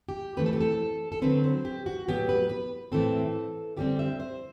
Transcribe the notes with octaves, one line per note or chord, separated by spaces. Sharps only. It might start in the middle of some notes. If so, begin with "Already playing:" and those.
G4
E3 A3 C4 B4
A4
G4
A4
A4
D3 F#3 C4 B4
C5
G4
F#4
A2 F#3 B3 G4
B4
B4
A2 E3 A3 C4 A4
D3 G3 C4 G4
E5
C5